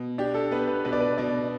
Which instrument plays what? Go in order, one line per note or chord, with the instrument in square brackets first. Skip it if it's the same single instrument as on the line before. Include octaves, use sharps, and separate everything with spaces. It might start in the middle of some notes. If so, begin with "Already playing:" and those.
Already playing: [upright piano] B2
[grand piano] D4 [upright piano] G4
[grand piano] A4
[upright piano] B3 [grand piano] B4
[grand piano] B4
[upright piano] B2 [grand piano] B4
[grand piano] D5
B4
[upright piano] B2 [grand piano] D5